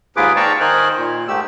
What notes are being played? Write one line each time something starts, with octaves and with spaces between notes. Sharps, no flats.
D#2 G#2 F4 G#4 B4 D6
D5 F5 G5 A5 A#5 C#6
D#3 A#4 C5 D#5 G#5 F#6
A#2
G#2 A3 G4 E6